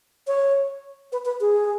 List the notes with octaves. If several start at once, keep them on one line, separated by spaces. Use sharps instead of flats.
C#5
B4
B4
G#4